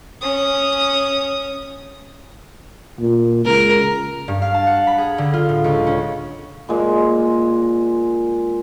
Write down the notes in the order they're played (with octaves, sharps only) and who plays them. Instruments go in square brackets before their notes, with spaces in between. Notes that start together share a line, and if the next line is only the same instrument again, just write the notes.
[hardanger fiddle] C#4 D#6
[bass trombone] A#2
[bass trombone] C#2 [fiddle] A#4
[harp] G2
F5
A5
F#5
B5
G#4
D3
F4
A2
C#2
C#4
[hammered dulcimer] A#2 G#3